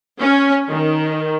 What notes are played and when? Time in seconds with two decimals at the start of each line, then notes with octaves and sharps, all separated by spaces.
0.21 C#4
0.72 D#3